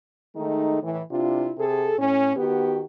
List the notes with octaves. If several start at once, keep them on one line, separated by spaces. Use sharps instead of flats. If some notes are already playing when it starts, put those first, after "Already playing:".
D#3 G#3 A3 D#4
A2 E3
C3 D4 E4 F4
C3 G#4 A4
A2 C#4
D#3 B3 F#4 G4